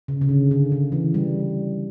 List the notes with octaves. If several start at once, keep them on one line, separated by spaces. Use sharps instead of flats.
C#3
C#3
D3
D3
D3
E3
G3